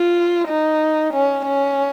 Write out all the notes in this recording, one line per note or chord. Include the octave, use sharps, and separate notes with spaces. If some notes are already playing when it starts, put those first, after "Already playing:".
Already playing: F4
D#4
C#4
C#4